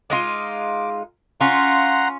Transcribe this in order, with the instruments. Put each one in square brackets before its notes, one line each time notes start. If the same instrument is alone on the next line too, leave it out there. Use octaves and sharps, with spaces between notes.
[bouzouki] G#3 D#4 F4 [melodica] D6
[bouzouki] C#4 F4 [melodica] F#5 A#5 C6